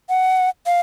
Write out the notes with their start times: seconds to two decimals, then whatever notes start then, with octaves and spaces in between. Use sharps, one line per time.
0.09 F#5
0.66 F5